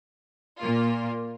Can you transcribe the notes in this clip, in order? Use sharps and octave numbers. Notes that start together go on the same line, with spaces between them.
A#2 A#3 F4